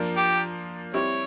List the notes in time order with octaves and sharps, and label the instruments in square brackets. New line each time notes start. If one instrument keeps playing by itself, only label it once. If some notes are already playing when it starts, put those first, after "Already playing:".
Already playing: [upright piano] F3 A#3 D4 F4 A#4
[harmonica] G4
[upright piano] G3 C4 E4 G4 [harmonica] C#5